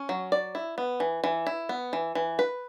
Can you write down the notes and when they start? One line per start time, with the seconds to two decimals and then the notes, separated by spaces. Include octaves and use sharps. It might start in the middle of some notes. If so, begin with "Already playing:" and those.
Already playing: C#4
0.09 F#3
0.32 D5
0.55 E4
0.78 B3
1.00 E3
1.24 E3
1.47 E4
1.69 B3
1.93 E3
2.15 E3
2.39 B4